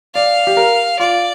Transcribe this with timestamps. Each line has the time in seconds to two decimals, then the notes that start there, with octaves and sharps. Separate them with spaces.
0.15 D5 F5
0.47 G4
0.57 A#4
0.99 F4 D5